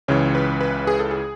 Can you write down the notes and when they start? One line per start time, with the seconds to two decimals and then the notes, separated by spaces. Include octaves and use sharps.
0.08 C#2 C#3 E3 C#5
0.35 B4
0.61 B4
0.87 G#4
0.99 A4
1.11 G#4